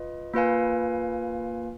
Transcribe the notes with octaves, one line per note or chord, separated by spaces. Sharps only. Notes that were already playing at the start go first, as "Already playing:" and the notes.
Already playing: F4 B4 D#5
A#3 F4 B4 F5 G#5